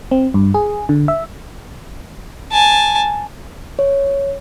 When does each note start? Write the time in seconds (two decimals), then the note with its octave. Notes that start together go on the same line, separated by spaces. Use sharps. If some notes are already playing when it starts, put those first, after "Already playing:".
0.11 C4
0.34 G2
0.54 G#4
0.89 D3
1.08 E5
2.52 G#5 A5
3.79 C#5